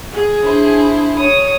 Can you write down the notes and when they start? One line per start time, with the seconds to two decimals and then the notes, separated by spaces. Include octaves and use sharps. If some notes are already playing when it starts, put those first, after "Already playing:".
0.12 G#4
0.43 D4 E4 C5
1.18 C#5 D#6